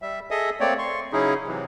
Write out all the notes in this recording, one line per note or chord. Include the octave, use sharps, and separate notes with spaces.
G3 E5
G#4 A4 D#5 E5 D#6
A3 A#3 C4 C#5 D5
C6 C#6
C#3 F#3 C#4 D#4 E4 G#4
C3 E3 F#3